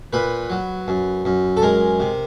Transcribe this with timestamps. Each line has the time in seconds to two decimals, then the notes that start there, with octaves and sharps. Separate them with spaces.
0.13 A#2 B4
0.50 F#3
0.88 F#2
1.25 F#2
1.57 A4
1.62 G#3 A#4
2.00 C3